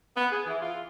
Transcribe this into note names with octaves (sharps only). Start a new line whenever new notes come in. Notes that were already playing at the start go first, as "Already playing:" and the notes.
B3
G#4
E3
F4